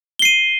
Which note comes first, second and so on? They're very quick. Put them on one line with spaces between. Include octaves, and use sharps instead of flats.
G7 C7 D#7